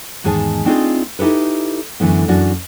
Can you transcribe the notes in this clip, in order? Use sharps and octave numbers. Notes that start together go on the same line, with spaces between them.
E2 G#2 D#3 G#4 A5
A3 C4 D4 D#4 F4 G#4
D#4 E4 G4 A4 B4
F#2 D3 E3 A3 B3
F#2 D4 F#4